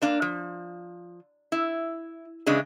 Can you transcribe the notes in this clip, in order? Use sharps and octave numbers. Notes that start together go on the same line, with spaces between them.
A#3 D4 F5
F3
E4
C#3 E3 G#3 D4